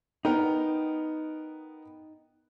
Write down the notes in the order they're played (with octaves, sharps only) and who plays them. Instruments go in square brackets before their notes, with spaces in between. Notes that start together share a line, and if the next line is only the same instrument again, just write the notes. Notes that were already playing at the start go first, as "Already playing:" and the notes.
[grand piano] B3 A#4 G5 [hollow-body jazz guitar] D#4